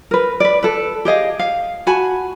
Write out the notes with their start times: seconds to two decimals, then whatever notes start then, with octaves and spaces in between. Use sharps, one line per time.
0.11 A#4 B4
0.40 B4 D5
0.63 A4 B4
1.05 G4 G#4 D#5 F5
1.39 F5
1.87 F#4 G#5 A5 B5